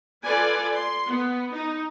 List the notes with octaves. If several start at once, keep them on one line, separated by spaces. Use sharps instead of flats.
F4 A4 B4 D5 G#5
C6
B3
D#4